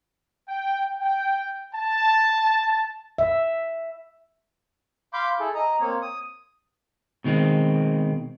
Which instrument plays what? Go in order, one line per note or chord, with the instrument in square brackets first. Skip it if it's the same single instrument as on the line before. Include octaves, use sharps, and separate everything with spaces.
[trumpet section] G5
G5
A5
[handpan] E5
[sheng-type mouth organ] F5 B5 C6 D6 G6
E4 G#4 A4
D#5 A#5
A#3 C4 C#5
D#6
[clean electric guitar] B2 D#3 G#3 C4